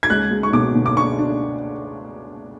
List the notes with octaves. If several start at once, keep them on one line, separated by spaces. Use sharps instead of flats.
G#6
C#2 F#6
C#2
C#6
B2 D6
B2
D6
D4 C#6
D4